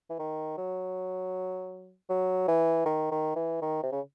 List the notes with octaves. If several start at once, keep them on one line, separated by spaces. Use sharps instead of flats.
E3
D#3
F#3
F#3
E3
D#3
D#3
E3
D#3
C3
C#3